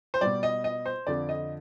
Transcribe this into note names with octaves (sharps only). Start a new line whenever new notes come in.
C5
B2 G3 D5
D#5
D#5
C5
F2 D3 F3 D5
D#5